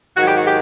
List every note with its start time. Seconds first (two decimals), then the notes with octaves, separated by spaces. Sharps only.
0.17 G#2 D#3 F#3 F#4
0.27 G4
0.37 F#4
0.46 G4